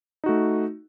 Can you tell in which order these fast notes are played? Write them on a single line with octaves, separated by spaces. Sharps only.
D#4 F#4 A3